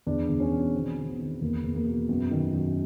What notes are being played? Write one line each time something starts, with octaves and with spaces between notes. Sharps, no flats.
E2 D4
E2
C#4
B2
D#3 C4
D#3
B3
D#3
E2 A#3
E2
A#3
B2
F#2 B3
D#3
F#2